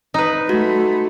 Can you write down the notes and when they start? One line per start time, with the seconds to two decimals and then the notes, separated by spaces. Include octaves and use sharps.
0.14 D#4 B4
0.49 A3 F#4